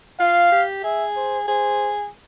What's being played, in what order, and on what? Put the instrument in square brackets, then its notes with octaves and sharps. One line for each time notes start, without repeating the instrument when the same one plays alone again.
[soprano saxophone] F4 [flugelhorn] F5
[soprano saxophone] G4
[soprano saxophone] G#4 [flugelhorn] E5
[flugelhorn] C5
[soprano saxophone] G#4 [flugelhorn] C5